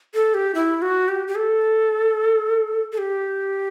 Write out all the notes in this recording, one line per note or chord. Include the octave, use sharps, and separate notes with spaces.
A4
G4
E4
F#4
G4
G4
A4
A4
G4